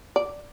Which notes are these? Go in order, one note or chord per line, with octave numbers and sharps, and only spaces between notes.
D5